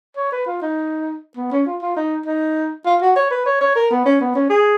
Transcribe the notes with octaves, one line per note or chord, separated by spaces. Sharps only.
C#5
B4
F4
D#4
B3
C#4
F4
F4
D#4
D#4
F4
F#4
C#5
B4
C#5
C#5
A#4
B3
C#4
B3
C#4
G#4